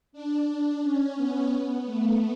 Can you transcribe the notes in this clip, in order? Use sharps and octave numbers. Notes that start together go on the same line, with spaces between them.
D4
D4
C#4
B3
B3
A3